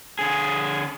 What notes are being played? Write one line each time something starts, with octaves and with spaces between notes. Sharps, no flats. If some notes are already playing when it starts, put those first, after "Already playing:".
D3 G#4